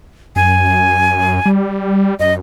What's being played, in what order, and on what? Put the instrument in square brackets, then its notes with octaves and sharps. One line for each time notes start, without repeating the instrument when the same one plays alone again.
[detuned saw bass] F#2 [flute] G#5
[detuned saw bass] G3
[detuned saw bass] F#2 [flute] D#5